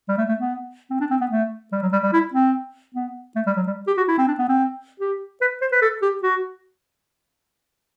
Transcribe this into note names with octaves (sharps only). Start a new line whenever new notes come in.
G3
A3
A3
B3
C4
D4
C4
B3
A3
G3
F#3
G3
G3
E4
C4
B3
A3
G3
F#3
G3
G4
F#4
E4
C4
D4
B3
C4
G4
B4
C5
B4
A4
G4
F#4